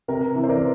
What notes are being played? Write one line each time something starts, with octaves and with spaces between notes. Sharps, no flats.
C3 A#4
E3
C5
A#4 D5